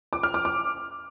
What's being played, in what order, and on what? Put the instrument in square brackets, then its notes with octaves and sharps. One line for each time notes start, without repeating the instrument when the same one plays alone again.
[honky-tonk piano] D6
F6
D6
D6